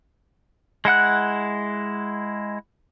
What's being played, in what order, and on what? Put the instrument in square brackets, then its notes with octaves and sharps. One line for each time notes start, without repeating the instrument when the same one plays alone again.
[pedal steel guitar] G#3 E4 F#5 F#6